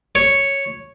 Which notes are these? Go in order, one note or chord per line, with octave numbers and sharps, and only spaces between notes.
C#5